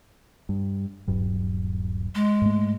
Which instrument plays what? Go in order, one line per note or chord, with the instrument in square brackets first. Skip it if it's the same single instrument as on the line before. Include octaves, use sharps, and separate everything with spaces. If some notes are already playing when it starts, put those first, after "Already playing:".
[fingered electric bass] G2
D#1 G2 F#3
[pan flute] G#3
[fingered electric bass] G#2 A3